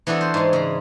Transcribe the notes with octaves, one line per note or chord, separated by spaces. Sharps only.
E3 B3 D4 F#4 A4
C5
G#2 G#3
C#3 A#5